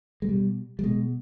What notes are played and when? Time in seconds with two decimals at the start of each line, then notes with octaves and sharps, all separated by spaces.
0.22 G#3
0.29 B2 G3
0.79 G3
0.84 B2 G#3